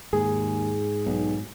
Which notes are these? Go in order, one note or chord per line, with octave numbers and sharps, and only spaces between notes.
D#2 G#2 G#4
B1